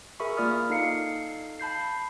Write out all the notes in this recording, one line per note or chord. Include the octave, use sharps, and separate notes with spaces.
G#4 A#4 E5 B5 C#6
A#3 F4 D5 D#6 F6
D#4 A4 F5 C7 C#7
A5 B5 G6 C7